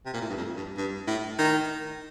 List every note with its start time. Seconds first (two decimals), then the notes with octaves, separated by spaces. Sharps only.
0.06 C3
0.14 A#2
0.21 A2
0.29 G2
0.37 F2
0.56 G2
0.77 G2
1.07 A2
1.39 D#3